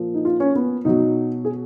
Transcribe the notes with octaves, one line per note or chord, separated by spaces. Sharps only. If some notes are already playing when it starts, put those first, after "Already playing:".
Already playing: A#2 F3
D#4
F4
C#4
B3
B2 F#3 D#4
G#4